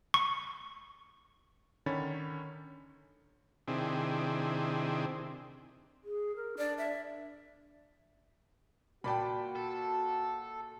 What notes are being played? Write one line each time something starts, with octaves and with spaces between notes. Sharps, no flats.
C#6
D3 D#3 C#4 C#5 B5 A6
C3 D#3 C4 D4 E4 G#4
G#4
A#4
D4 D5
E5
A#2 F#4 D5 G5 A5 B5
A4